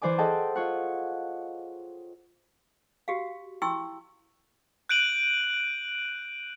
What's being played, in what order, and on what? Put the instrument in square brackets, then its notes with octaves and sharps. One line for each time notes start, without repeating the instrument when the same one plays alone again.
[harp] E3 C5 D5 G#5 D6
G#4 A4 D#5 F#5 G5 A5
F4 C#5 F#5
[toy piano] F#4 G4 F5
E4 G5 C6 C#6 E6
[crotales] F#6 G6 D7 D#7 F#7